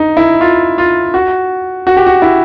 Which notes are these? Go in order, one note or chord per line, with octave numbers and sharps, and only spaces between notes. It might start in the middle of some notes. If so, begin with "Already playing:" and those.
Already playing: D#4
E4
F4
F4
F#4
F#4
G4
F#4
E4